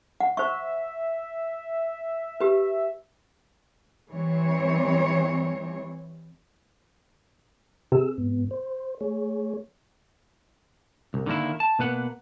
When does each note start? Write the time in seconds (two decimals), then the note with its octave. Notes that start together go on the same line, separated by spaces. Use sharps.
0.20 F#5
0.37 C5 E5 C#6
2.40 G4 B4
4.11 E3 G3 C4 C#5
7.92 C3 G#4 E6
8.18 G#2 B3
8.51 C5
9.01 A3 G#4 C#5
11.14 C2
11.26 D3 D#3 G3 A#3 E4
11.60 A5
11.79 B2 A#3 B4 F#5